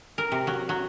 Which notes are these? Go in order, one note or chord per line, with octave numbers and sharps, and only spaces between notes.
A#4
C3
F#3
F#3